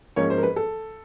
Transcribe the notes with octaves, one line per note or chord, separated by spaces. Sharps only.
G#2 F3 A#3 C#4 C#5
C5
A#4
B4
A4